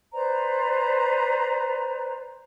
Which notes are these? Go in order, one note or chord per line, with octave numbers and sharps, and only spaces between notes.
B4 C5 D5 A#5